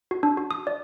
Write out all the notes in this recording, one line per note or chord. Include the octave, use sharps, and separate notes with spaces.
F#4
D4
F#4
D#6
D5